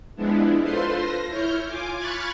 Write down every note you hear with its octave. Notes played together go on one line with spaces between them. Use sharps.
F3 G#3 B3 D4 E4
F4 A4 B4 C5 C6
A#6
E4 C#5 F6 G6
F4 G#5 D6
B5 C#6 F6 F#6 G#6 A6